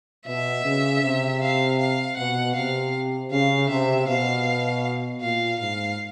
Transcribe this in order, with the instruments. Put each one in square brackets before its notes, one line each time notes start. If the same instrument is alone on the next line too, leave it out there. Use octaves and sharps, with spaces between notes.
[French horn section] B2 [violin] E5
[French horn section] C#3
C3
[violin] F5
F5
[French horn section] B2 [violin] F#5
[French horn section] C3 [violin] F5
[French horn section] C#3 [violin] F5
[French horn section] C3 [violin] E5
[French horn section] B2 [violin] F5
[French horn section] A#2 [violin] F5
[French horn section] G#2 [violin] F5